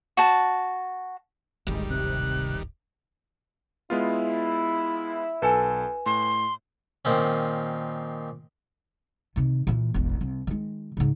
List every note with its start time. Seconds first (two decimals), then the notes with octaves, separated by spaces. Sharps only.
0.17 F#4 A5
1.67 D1 G#1 D#3 G3 G#3
1.90 C3 F#6
3.90 G#3 B3 E4 F4
5.42 B1 A4 B4 G#5 E7
6.06 A2 C6
7.05 A#2 D#3 C4 C#4
9.36 C3 D#3
9.67 A#2 E3
9.94 E1 A1
10.21 C2
10.47 D#3 G#3
10.97 G#2 C#3